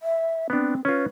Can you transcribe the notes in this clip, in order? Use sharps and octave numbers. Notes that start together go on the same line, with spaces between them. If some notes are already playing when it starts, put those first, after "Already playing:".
E5
B3 C4 D4
C#4 F4 B4